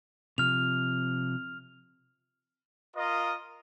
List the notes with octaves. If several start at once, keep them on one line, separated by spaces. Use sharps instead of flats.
C3 F3 F6 F7
F4 A#4 D#5